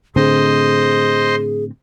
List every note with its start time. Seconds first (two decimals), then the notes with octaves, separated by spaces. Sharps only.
0.16 A2 D3 C4 G#4 C5 D#5 C6